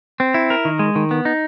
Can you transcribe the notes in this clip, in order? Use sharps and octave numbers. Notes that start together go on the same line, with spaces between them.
C4
E4
A#4
D#3
G#3
D#3
B3
D#4